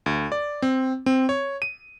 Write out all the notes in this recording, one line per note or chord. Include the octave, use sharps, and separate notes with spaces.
D2
D5
C4
C4
C#5
D#7